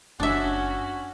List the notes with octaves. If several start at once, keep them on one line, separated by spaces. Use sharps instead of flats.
F#1 C#4 D4 F#4 E5